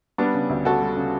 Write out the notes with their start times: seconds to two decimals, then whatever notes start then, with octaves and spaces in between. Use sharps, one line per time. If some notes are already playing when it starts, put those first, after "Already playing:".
0.18 G3 B3 D4
0.34 C#3
0.50 D2
0.65 D2 F#4 A4
0.81 G3
0.97 C#3